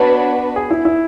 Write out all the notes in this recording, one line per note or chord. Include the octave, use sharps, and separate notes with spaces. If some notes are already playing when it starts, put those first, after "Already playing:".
Already playing: B3 D4 F#4 B4 C#5
G#4
E4
E4